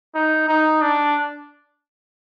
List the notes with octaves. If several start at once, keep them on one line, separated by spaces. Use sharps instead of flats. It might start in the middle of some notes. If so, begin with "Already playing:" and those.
D#4
D#4
D4